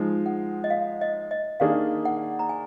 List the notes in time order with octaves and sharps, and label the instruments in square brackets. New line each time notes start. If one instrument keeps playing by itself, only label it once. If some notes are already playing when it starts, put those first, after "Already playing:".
Already playing: [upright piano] F3 G#3 D#4
[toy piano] F#5
D#5
F5
D#5
D#5
[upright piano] D#3 A#3 D4 G#4 [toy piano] F5
[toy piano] F#5
A#5
G#5